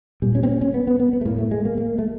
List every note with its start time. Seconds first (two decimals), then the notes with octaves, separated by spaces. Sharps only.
0.22 A#2 G3
0.35 C#4
0.43 C4
0.48 C#4
0.61 C#4
0.74 B3
0.87 B3
1.00 B3
1.13 B3
1.21 A3
1.25 A2 A#3
1.38 A3
1.51 G#3
1.65 A#3
1.78 A#3
1.99 A3